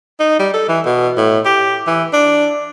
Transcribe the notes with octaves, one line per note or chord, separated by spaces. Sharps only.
D#4
G3
A4
E3
B2
A2
G4
E3
D4